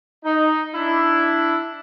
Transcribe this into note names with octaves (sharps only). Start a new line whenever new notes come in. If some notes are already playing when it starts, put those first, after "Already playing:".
D#4
D4 E4